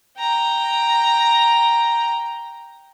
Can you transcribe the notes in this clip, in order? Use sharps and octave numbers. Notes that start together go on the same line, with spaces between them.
G5 A#5